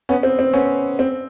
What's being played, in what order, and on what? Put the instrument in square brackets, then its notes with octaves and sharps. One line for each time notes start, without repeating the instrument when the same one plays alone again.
[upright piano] B3 C#4
C4
C4
B3 C#4
C4